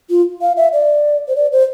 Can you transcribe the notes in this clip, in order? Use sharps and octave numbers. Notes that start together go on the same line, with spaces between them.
F4
F5
E5
D5
C5
D5
C5